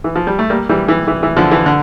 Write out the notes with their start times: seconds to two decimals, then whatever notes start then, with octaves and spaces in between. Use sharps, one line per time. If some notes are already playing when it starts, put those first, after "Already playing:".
0.04 E3
0.15 F3
0.27 G3
0.39 A3
0.50 G3 A#3
0.69 E3 G3
0.88 E3
1.08 E3
1.23 E3
1.37 D3 F3
1.51 E3
1.66 D3